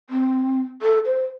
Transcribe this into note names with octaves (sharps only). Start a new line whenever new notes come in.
C4
A4
C5